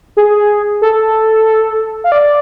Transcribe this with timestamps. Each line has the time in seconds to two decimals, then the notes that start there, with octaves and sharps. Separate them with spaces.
0.17 G#4
0.82 A4
2.04 F5
2.12 D5